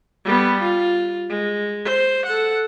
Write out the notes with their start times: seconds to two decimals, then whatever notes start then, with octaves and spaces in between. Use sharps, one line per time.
0.25 G3 B3
0.61 F4
1.29 G#3
1.85 C5
2.26 A4 F#5